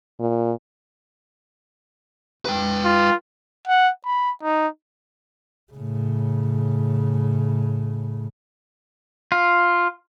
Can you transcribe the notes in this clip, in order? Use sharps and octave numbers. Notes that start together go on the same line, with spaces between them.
A#2
B4 G5
F4
F#5
B5
D#4
A2 C#3
F4